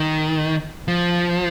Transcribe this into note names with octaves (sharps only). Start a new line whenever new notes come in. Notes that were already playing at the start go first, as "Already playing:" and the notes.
Already playing: D#3
F3